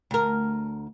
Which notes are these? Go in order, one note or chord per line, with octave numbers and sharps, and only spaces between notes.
D2 A#4